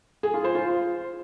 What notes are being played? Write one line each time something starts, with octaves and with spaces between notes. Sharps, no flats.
G#4
F4
C5
F4